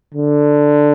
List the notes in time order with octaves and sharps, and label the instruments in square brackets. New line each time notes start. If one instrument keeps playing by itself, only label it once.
[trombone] D3